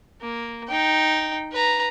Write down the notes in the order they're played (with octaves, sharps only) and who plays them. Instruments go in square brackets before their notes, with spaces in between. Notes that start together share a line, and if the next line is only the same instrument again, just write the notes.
[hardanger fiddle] A#3
D#4 G5
B4 A#5